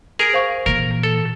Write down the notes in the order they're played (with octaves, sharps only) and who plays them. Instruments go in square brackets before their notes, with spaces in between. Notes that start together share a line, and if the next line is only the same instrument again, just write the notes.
[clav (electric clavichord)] G#4 A#4 [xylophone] D7 F7
[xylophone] C5 F5 C#6
[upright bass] A#2 E3 [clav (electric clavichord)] A#4
[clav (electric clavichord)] A4